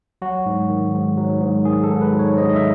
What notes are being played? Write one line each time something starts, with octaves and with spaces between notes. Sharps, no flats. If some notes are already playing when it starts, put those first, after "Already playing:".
F#3 F#4
G#2
D#3
G#2
F#3
G#2
D#3 G#4
A4
G#2
B4
F#3
C#5
G#2 D#5
D#5
E5